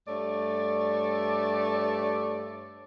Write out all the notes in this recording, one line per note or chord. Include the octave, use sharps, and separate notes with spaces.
G2 A3 C#5 D5